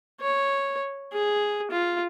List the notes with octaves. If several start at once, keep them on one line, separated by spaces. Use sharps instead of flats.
C#5
G#4
F4